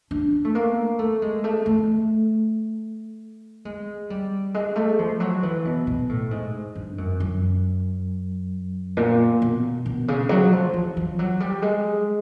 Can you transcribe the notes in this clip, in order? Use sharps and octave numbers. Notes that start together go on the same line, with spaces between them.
D4
A3
A#3
A3
G#3
A3
A3
G#3
G3
G#3
A3
F3
F#3
E3
B2
B2
A2
G#2
G2
F#2
F#2
A#2
B2
B2
C#3
F#3
F3
E3
F3
F#3
G3
G#3